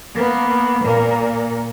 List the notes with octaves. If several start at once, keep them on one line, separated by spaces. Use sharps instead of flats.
A#3 B3
A#2 A#3